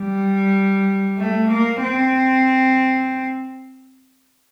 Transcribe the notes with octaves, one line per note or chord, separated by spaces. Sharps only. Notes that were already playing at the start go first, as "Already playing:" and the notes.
Already playing: G3
A3
A#3
C4